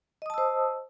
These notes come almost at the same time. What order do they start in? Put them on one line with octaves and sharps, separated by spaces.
D#5 D#6 A5 E6 C5